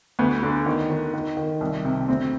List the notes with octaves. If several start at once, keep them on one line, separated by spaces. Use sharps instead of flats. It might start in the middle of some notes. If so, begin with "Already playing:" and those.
D2 B3
D3
D#3
D#3
D#3
D#3
C2
C3
D2 C4